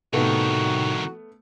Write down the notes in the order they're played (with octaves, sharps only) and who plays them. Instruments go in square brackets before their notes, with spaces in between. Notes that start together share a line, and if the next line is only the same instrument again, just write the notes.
[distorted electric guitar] C2 D#3 [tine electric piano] A2 C3 D#4 [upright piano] A3 B3 [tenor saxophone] F#4